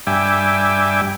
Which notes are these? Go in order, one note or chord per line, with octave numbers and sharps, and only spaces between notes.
G2 E5 G5 G#5 D6